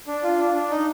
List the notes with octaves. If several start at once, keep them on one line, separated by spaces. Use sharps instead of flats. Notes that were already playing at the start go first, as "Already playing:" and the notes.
D4
F4
D4
D4
D#4